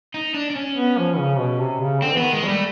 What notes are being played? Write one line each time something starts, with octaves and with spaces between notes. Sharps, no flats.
D#4
D4
D4
C#4
B3
F3
C#3
B2
C3
C#3
D3 C4
E3 B3
D#3
G#3
G3 A3